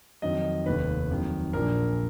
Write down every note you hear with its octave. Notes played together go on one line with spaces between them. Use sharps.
F2 D#3 F#3 D#5
F1 D#2 D#3 B4
F2 D#3 F#3
A#1 A#2 F3 A#4